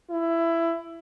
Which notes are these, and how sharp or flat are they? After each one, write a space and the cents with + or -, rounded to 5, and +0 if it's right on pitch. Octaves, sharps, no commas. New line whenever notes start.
E4 +15